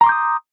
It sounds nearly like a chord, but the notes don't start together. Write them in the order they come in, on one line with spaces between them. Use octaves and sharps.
A#5 C6 D6 G6 D#6